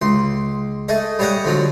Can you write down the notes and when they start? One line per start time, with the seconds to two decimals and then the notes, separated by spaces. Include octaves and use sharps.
0.02 C#2 C6
0.89 A3 G#4 D#5
1.19 G3 G#4 C#5 D#5 F#5 G5
1.45 D3 F3 F#3